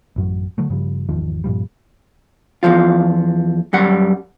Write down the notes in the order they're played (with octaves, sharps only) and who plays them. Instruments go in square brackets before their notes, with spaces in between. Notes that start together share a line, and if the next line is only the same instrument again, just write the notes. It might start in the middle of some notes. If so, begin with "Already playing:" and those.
[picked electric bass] A1 F#2 F#3
D3 F#3 A3
G2 C#3 F3 G3
G#1 E2 D#3 F3
G2 A#2 F3 G3
[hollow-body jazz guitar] E2 G2 F3 F4
F#2 G3 F#5